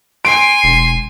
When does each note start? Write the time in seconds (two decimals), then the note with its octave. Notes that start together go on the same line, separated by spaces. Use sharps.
0.25 G#5 C6 D7
0.64 E1